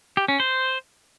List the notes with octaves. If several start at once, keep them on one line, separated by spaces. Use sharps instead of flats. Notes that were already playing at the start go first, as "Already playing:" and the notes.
G4
C#4
C5